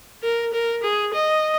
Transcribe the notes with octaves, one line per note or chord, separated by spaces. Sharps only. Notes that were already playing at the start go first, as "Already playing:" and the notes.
A#4
A#4
G#4
D#5